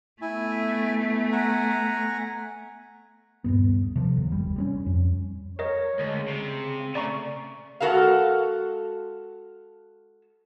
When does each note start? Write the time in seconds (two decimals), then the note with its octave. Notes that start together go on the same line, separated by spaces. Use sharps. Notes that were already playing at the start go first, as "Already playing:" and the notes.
0.22 A3 B3 E4 G#5
1.32 F#5 G#5 A#5
3.44 D#1 G#1 G2 B3
3.96 C3 F3
4.17 D#2
4.32 F#1 G3
4.56 G3 B3 C#4
4.86 F2
5.59 A#4 C#5 D#5
5.99 D2 G#3
6.14 C#3
6.28 C3
6.95 C#3 A3 D5 A#5 C#6
7.80 G#3 F#4 A4 A#4 F5